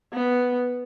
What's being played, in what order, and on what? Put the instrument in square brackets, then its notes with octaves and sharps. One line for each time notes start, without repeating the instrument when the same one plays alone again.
[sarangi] B3